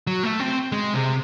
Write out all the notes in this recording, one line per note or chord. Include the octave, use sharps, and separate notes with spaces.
F#3
A3
C4
G#3
C3